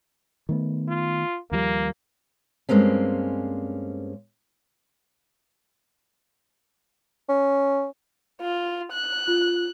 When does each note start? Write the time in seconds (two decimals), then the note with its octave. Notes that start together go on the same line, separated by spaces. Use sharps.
0.49 D#3 A3 B3
0.88 F4
1.51 D#2 F3 G3 A#3
2.69 G2 G#3 A#3 C4 C#4
7.29 C#4
8.41 F4
8.92 F#6
9.27 F4